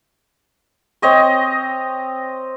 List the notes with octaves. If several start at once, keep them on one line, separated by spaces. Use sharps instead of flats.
C4 C#5 D#5 C#6